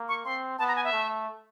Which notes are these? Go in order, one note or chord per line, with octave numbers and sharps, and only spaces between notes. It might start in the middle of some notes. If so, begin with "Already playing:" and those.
Already playing: A#3
C#6
C4 C6
B3 A5
A#5
G#5
E5
A3